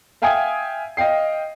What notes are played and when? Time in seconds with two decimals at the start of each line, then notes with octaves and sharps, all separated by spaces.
0.22 E5 F5 G5 G#5 D#6 G#6
0.97 D#5 F5 G5 C7